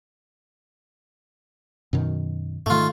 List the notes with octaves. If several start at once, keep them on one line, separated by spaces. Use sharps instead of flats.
F#2 B2 D#3
G#2 D#3 A3 F4